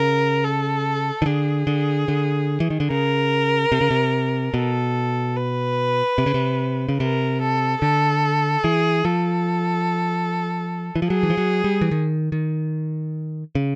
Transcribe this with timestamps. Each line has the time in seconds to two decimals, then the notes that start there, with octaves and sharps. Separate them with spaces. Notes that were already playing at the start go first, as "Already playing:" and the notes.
Already playing: C#3 A#4
0.44 A4
1.22 D#3
1.26 D3 G#4
1.67 D3
2.08 D3
2.60 E3
2.70 D#3
2.80 D3
2.90 C#3 A#4
3.72 C3
3.81 C#3
3.91 C3
4.54 B2 A4
5.36 B4
6.18 C3
6.26 C#3
6.34 C3
6.89 C#3
7.00 C3 A#4
7.41 A4
7.81 D3 A4
8.64 E3 G#4
9.05 F3 A4
10.96 E3
11.02 F3
11.09 F#3 G#4
11.23 E3
11.30 F3
11.37 F#3
11.64 G3
11.81 E3
11.91 D#3
12.32 D#3
13.55 C#3